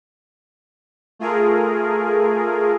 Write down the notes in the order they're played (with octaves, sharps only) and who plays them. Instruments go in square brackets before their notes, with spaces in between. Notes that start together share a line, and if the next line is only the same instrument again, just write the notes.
[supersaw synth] A3 F4 G#4 A#4